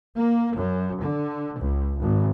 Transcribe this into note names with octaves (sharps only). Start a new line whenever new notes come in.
A#3
F#2
D3
C#2
G#1